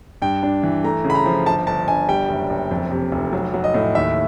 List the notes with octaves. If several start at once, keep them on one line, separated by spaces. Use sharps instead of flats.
G2 G5
D4
E3
A3 A#5
C#3
B5
A#5
F3
G1 A5
G1 A5
G1 G#5
G3 G5
F#1
F#1
F2
C3
F1
F#3
F#3
D#5
A2
D#2 E5